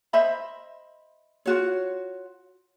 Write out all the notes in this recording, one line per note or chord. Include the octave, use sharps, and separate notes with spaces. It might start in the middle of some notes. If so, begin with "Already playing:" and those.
C5 D#5 E5 B5
F4 F#4 C#5